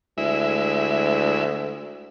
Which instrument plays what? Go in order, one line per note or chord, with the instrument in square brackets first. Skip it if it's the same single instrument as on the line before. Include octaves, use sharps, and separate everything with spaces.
[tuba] D2 [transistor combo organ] G#3 E4 E5